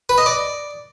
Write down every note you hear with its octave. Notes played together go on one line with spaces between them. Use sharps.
B4
D#5
D5